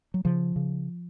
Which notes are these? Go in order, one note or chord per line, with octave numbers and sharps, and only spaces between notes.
F#3
C#3 F3
C#3